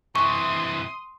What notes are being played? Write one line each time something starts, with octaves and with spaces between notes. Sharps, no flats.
C3 E3 C6 C#6 D#6